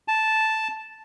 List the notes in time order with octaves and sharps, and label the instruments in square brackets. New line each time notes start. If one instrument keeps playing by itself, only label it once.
[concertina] A5